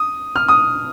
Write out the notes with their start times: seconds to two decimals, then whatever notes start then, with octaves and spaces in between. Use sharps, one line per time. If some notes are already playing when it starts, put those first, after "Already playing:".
Already playing: D#6
0.36 F6
0.48 D#6